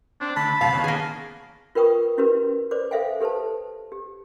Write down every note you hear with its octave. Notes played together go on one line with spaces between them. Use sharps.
C4 D4
D3 A3 A5 B5
F#2 A2 C3 F5 A5
D#3 B3 C#4
A#3 G#4
F4 A#4 B4 G5 C#6 D#6
C#4 E4 F#4 G4 A#4 B4
B4 C5 D5 D6
A4 C5 E5 F5 G5 G#5
G4 A4 B4 C5 A5
G4